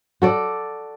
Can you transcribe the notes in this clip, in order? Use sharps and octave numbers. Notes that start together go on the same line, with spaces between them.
F#4 A4 D5